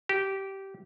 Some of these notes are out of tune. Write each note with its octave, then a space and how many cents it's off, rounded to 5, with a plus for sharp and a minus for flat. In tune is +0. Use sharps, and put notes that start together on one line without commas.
G4 -15